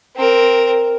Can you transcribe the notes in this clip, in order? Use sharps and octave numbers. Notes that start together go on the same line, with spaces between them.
C4 A#4